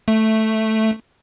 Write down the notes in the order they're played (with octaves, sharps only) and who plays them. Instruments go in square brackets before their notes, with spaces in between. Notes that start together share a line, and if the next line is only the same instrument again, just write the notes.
[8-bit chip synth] A3